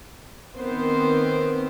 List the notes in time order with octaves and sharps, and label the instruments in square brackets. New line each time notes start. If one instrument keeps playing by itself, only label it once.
[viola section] D#3 B3 C4 C5